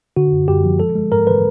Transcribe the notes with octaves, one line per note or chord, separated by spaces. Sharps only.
D3 F#4
F#2
F#2 G4
F3
G#3 A4
G#3
G#2 A#4
E3 B4